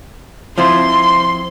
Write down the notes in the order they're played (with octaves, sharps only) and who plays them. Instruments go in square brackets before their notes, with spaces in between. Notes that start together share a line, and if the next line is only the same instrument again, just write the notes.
[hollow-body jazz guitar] F3 C4 E4 [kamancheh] C6